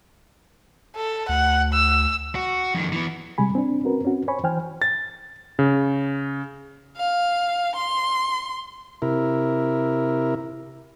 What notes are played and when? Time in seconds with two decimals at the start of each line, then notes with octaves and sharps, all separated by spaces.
0.96 A4
1.29 D2 F#5
1.74 E6
2.35 F#4
2.75 F2 D#3
2.92 E3 B3
3.38 C3 G3 G#3 G#5 B5
3.55 C4 D4
3.83 C4 C#4 F#4 A#4 B4
4.03 C4 C#4 F#4
4.28 C5 C#5 G#5 B5 C#6
4.44 E3 C5 G5 G#5 F6
4.82 A6
5.59 C#3
6.98 F5
7.76 C6
9.02 C3 E4 A#4